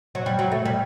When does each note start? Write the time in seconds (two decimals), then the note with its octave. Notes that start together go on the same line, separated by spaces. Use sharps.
0.15 F#3
0.26 G3
0.39 F#3
0.52 A3
0.65 G3